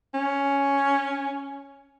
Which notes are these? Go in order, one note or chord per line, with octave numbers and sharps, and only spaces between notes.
C#4